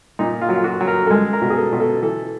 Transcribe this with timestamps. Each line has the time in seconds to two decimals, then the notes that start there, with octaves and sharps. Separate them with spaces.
0.19 A#2 D#4
0.41 F4
0.49 F#3
0.55 F4
0.64 F#4
0.81 F#3
0.87 A#4
1.06 A4
1.11 G#3 A#4
1.33 A#4
1.42 B2
1.50 G#4
1.57 A4
1.73 B2
1.80 A4
2.02 E3 A4